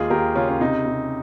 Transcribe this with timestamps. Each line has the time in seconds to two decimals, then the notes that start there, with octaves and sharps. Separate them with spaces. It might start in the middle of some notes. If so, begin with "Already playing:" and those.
Already playing: D#2 G#3 F4 G#4
0.10 D#2 G4 A#4
0.35 C#3 C#4 F4
0.49 C#4
0.60 C3 D#4
0.85 C3